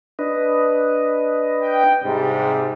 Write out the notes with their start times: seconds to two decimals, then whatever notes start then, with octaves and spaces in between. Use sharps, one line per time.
0.19 D4 B4 D#5
1.62 G5
2.04 G#2 C3 G3